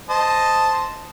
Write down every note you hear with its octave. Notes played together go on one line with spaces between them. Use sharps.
C5 D#5 A5